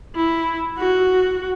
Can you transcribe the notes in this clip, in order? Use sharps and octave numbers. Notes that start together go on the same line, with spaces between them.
E4
F#4